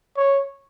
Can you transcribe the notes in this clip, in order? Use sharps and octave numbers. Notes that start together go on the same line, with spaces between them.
C#5